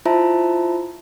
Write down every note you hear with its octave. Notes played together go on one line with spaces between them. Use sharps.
E4 F4 C5 E5 A5 A#5